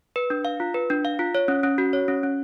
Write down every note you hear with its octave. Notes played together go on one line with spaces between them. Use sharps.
B4
D4
F5
F4
B4
D4
F5
F4
C#5
C#4
C#4
F#4
C#5
C#4
C#4